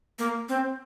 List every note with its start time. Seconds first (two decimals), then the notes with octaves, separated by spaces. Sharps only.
0.19 A#3
0.49 C4